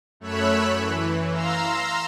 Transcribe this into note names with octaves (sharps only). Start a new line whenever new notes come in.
F#2 A3 C#5 B5 E6 F#6
E3
F5 A#5 C6 E6